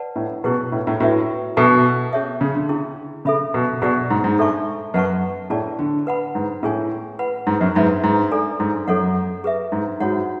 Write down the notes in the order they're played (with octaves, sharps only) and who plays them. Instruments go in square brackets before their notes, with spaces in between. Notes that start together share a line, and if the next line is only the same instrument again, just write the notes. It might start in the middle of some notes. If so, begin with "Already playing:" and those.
Already playing: [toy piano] B4 D5 F#5 A5
[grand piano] A2
[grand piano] B2 [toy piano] C#4 E4 G#4 B4
[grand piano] A2
A2
[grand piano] A2 [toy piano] F#4 B4 E5
[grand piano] B2 [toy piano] D4 A4 E5 A5
[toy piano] C#4 G#4 C#5 E5
[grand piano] C#3
D3
[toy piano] C#4 E4 G#4
[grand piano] C#3 [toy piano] A4 E5 B5
[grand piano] B2
[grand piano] B2 [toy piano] G#4 D5 F#5
[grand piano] G#2
G#2
[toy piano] D4 A4 E5 A5 C#6
[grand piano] F#2 [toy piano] B4 F#5 A5 C#6
[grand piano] A2 [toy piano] G#4 D5 A5
[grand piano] D3
[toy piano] B4 F#5 B5
[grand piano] G#2
[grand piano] A2 [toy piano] C#4 G#4 C#5 G#5
[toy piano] B4 F#5 B5
[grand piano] G#2
F#2
[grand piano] G#2 [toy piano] B4 E5 B5
[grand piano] G#2
[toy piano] D4 A4 D5 G#5
[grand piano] G#2
[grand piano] F#2 [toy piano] A4 C#5 F#5
[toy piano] G#4 B4 E5
[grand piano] G#2
[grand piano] G#2 [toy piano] F#4 C#5 F#5